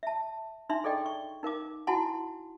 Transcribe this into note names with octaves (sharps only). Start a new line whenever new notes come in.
E5 A5
D4 D#4 E5 C6
G#4 A4 D5 D#5 G5
C#6
D#4 A#4 F5 D6
E4 F#4 F#5 G#5 A5 C6